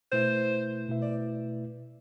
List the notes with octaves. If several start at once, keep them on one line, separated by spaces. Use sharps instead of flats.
B2 A3 E4 B4 C5 E5
B2 A3 E4 B4 E5
D5